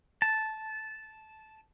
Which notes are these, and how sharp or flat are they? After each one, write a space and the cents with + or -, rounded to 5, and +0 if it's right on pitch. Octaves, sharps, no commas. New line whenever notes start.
A5 -10